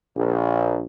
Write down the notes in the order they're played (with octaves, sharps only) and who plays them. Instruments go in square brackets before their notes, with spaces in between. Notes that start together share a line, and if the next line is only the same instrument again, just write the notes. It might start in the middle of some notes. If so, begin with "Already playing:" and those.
[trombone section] A#1